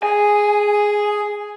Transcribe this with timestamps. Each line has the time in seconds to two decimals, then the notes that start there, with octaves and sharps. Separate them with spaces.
0.03 G#4 G#5